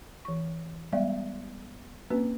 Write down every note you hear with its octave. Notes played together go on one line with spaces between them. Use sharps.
E3 C#6
G3 G#3 B3 D5 E5
A#3 C4 C#4 F#4 B4